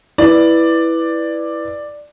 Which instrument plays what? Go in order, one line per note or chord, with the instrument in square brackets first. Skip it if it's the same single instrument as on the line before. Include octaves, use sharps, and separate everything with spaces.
[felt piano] E4 B4 [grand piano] D5